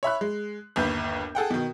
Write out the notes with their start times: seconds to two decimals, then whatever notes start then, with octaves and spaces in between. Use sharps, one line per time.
0.03 C#5 E5 B5 F#6
0.21 G#3
0.76 G1 D#2 B4 G6
1.35 G#4 A4 F#5 G5
1.51 B2 D#3